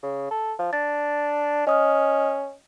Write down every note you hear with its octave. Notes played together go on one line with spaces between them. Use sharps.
C#3
A4
F3
D4 A6
C#4 D#5 D#6 F6